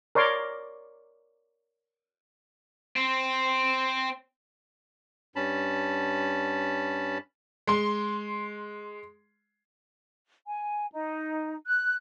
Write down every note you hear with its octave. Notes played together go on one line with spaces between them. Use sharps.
A#4 C#5 D5 C6 D6
C4
G2 C#4 A5 B5
G#3 C6
G#5
D#4
F#6